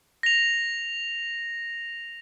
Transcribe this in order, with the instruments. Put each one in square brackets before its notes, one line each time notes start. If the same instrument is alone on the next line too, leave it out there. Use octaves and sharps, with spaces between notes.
[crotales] A#6 F7